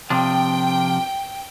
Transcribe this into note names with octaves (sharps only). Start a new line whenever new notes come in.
C3 F3 D4 G5